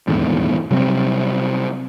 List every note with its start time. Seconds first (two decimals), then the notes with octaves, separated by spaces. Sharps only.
0.07 D#1 E2 G#2 D3
0.70 C3 F#3 G3 C4